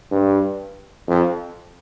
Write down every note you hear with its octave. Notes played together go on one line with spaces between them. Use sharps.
G2
F2